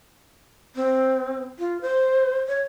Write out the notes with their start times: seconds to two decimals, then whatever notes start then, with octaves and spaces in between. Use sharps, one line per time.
0.76 C4
1.59 F4
1.82 C5
2.48 C#5